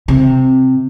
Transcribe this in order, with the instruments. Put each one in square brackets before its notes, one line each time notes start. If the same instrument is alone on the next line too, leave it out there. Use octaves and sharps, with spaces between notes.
[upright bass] C3